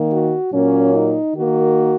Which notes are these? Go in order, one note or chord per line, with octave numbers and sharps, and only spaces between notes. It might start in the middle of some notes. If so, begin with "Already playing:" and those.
Already playing: D#3 A#3
F#4
A#2 F#3 A#3 C#4
D#4
D#3 A#3 F#4